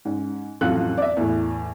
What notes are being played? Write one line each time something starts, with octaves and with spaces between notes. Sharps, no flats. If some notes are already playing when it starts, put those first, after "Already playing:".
G#2 C#4
A1 F2 F#3 F4 A4 F#6
D5 E5
E2 A2